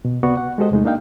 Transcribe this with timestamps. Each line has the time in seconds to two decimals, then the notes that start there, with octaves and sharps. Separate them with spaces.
0.05 B2
0.23 C#2 C3 B3 F#4 D5 C#6
0.37 F#5
0.58 G#3 F#4 G4 A4 C5 D#5
0.71 E2 C3 G#3 A3 D#4
0.85 A#3 D4 D#4 F5 G5